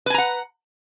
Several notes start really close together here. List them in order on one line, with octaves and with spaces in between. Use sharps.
B4 G#5 A#5 F#5